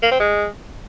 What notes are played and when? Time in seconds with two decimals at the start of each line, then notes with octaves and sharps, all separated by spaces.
0.02 A#3
0.11 C4
0.20 G#3